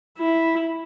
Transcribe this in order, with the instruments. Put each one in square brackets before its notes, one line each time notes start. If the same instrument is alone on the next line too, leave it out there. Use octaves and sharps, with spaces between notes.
[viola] E4